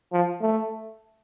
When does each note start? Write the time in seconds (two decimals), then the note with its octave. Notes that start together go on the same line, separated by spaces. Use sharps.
0.13 F3
0.41 A3